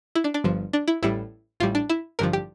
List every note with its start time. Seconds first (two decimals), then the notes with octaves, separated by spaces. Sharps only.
0.15 E4
0.24 D4
0.34 D4
0.44 G1 G2 F3
0.73 D4
0.88 E4
1.03 A1 A2 G3 E4
1.60 A1 A2 G3 F4
1.75 D4
1.89 E4
2.19 A1 G2 D3 F3 A#4
2.33 G4